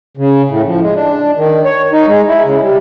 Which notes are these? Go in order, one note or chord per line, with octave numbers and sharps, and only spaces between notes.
C#3
A2
F3
G#3
D4
D#3
C#5
D#4
G#3
E4
C#3
G3